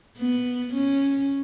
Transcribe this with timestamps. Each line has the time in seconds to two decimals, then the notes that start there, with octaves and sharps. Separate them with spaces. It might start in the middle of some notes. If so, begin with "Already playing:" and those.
0.17 B3
0.74 C#4